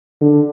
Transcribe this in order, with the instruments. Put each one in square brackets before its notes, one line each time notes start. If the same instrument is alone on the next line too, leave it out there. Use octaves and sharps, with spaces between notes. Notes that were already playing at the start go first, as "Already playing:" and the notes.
[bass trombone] D3